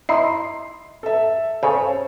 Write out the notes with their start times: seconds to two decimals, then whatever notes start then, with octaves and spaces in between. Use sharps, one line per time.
0.09 D#4 E4 C6 C7
1.03 A4 E5
1.63 C#3 A4 C5 C#5